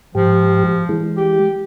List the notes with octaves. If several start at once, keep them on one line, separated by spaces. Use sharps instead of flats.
G#2 F3 G4
E3 G#3
G4